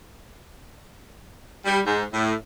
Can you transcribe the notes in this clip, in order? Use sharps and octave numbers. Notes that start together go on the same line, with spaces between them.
G3
G#2
A2